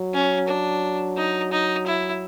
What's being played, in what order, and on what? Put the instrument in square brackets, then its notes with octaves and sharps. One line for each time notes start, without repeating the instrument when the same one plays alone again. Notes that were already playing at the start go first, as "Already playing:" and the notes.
Already playing: [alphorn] F#3
[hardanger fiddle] C#4
D4
D#4
D#4
E4